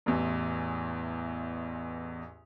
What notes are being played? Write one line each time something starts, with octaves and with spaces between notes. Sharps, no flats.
A1 E2